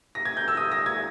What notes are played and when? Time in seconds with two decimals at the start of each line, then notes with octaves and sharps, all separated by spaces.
0.15 A#6
0.25 G#6
0.37 G6
0.48 E6
0.57 D#6
0.72 A#6
0.86 G#6